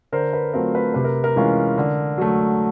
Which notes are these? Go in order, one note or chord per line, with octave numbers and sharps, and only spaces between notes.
D3 A#4 C5
B4
F#3 A3 C4 F4 A#4
B4
C3 B4
A#4
A#4
E3 G#3 C#4 F4
D3
F#3 A3